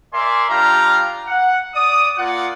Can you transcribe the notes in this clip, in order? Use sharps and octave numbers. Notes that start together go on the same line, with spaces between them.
A#4 D5 E5 G#5 C6
G3 D4 F4 F5 G5 A#5
F#5
D5 D#6
A#3 F4 D5 F#5